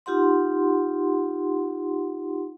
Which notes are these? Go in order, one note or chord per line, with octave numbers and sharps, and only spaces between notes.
D#4 F4 G4 F#5 C6